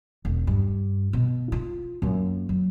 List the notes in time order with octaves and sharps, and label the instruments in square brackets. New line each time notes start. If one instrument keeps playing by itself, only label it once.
[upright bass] E1
G2
B2
F4
F#2 A#3
F#3